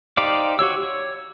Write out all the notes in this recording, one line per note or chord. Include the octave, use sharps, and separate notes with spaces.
D#4 G4 C5 D5 F5
F#4 G4 C#5 E6
C#5